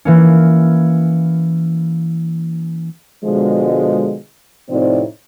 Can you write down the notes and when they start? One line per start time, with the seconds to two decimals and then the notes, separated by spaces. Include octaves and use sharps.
0.05 E3 A#3 C#4
3.24 B2 D3 F3 G#3
4.70 A2 C3 F3 C4 D#4 D5